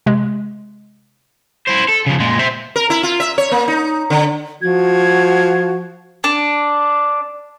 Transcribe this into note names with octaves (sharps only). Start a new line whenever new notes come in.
C3 G#3
E4 C5
A4
C#3 F3
A#2 G#3
C5 E5
A#4
E4
F4
E5
C#5
A#3
D#4
D3
F3 F#4 G#6
D4